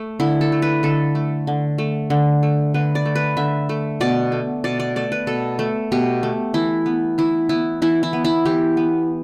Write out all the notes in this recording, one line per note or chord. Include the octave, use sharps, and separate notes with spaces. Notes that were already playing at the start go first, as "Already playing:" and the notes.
Already playing: A3
D3 E4
A4
A3
B4
D3 A4
A3
D3
A3
D3
A3
D3 B4
D5
A3
B4
D3 E5
A3
B2 D5
A3
B2 D5
D5
A3 D5
B4
B2 A4
A3
B2 G4
A3
E3 E4
B3
E3 E4
B3 E4
E3 E4
E4
B3
E4
E3 G4
B3